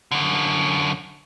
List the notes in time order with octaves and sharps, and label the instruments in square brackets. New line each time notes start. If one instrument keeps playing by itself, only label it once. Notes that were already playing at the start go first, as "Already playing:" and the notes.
[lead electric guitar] F#2 D3